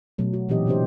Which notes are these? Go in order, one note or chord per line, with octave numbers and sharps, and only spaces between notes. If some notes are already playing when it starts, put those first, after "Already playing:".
B2 F#3 A3
F#4
A#2 E3 C4 D#4 G4 D#5
C3 D4 D#4 G4 C5